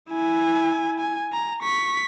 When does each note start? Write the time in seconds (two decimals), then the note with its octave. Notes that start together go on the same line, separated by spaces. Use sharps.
0.10 E4 G#5
1.00 G#5
1.33 A#5
1.63 C#6 B6